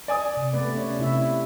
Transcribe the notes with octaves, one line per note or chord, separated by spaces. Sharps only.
D5 G#5 D#6
C3
A3 B3 B4 D5
C#4 C#5 D5
C3 E4 E5